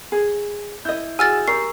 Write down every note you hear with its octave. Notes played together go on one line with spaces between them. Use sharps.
G#4
E4 D#5 G6
F#4 G#4 G#5 E6 F6 A6
G4 A#4 C#6 C7